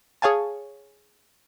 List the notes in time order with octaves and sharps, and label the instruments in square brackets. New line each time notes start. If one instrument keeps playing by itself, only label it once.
[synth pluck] G#4 C#5 F5 G#5 A5